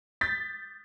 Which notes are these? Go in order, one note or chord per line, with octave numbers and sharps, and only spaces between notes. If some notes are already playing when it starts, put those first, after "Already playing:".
G6 A6 B6